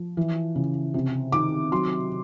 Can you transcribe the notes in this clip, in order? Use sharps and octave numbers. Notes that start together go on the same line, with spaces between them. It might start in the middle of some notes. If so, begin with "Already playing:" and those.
Already playing: F3
E3
C#3
C3
D#3 D6
F#3 C6